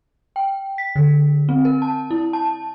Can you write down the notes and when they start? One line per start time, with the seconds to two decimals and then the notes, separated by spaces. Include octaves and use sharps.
0.36 G5
0.78 B6
0.96 D3
1.49 C4
1.65 A#4
1.82 A5
2.11 E4
2.33 A5